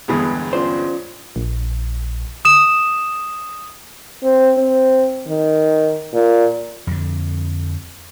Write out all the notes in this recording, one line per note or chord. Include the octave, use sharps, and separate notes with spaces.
G1 E2 G2 D3 G#3 B3
C#4 F4 C5 D5
A#1
D#6 E7
C4
C4
D#3
A#2
F2 D3